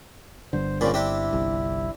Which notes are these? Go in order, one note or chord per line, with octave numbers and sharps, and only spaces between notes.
G1 G2 D3 C5
A#2 C#3 A#3 C4 D5 B5
C4 D4 E4 G4
G1 C2